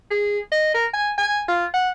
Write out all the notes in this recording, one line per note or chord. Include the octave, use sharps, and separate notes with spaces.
G#4
D#5
A#4
G#5
G#5
F4
F#5